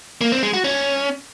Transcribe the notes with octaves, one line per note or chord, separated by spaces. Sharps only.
A#3
C4
G#3
F#4
C#4